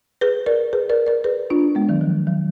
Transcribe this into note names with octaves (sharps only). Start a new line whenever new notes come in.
G#4 B4
A#4 D5
G#4 B4
A#4 D5
A#4 D5
G#4 B4
D4 F4
G#3 B3
D#3 F#3
F3
D#3 F#3